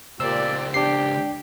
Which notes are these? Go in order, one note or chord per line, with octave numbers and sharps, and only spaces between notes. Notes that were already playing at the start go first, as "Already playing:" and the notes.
C#2 A#2 G4 C5 D5 E6
D4 G4 G5 C7